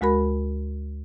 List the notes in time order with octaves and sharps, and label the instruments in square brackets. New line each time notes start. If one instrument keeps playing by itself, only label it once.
[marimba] D2 G#3 F#4 A#4 B5